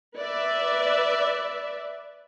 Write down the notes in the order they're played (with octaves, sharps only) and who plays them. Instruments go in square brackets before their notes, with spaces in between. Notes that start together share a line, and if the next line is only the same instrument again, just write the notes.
[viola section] B4 D5 E5